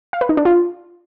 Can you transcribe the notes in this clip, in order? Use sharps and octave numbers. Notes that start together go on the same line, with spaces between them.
F5
B4
D#4
D4
F4